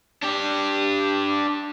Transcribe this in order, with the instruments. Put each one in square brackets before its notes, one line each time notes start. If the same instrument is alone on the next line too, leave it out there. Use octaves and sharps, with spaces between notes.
[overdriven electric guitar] D4 G4